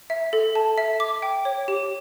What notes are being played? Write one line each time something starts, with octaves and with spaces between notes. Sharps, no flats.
E5
A4
A5
E5
D6
G5
C#5
G4